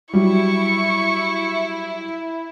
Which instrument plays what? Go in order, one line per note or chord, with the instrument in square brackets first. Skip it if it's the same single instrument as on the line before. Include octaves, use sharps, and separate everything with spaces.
[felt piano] F#3 G3 [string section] E4 [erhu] C#6